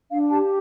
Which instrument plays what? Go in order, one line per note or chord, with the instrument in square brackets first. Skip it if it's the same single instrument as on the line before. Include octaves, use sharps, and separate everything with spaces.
[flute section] D4 F5
G4 A5